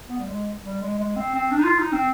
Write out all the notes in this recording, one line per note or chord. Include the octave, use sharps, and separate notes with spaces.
B3
G3
G#3
G3
G#3
G#3
C4
C4
D4
D#4
F4
D#4
C4